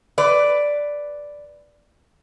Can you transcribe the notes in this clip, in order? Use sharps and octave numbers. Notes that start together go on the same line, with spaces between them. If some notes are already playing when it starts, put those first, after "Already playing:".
B4 D5